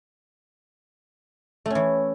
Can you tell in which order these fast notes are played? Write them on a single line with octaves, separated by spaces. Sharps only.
A3 C#4 E3